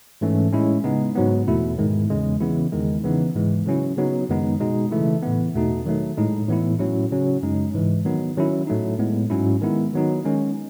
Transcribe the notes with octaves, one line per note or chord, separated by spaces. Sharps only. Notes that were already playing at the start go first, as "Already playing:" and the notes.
G#2 E3 A3 C#4
A2 G#3 C#4 E4
C#3 G#3 B3 D#4
G#2 F#3 B3
E2 B2 A3 E4
G#2 D#3 G#3
E2 C#3 G#3
C#3 E3 B3 E4
E2 D#3 G#3
C#3 E3 B3 D#4
G#2 E3 G#3
C#3 F#3 C#4 E4
C#3 F#3 B3 D#4
F#2 D#3 G#3 B3 D#4
B2 G#3 D#4
C#3 E3 A3 E4
A2 E3 B3
E2 B2 A3 D#4
D#3 F#3 A3 D#4
A2 G#3 D#4
A2 E3 B3 E4
A2 F#3 C#4 E4
C#3 F#3 C#4
F#2 C#3 G#3 D#4
G#2 E3 G#3
D#3 F#3 B3 D#4
D#3 F#3 C#4 E4
A2 F#3 A3 D#4
A2 G#3 B3
G#2 F#3 C#4 E4
D#3 G#3 B3 E4
D#3 F#3 B3 D#4
D#3 G#3 C#4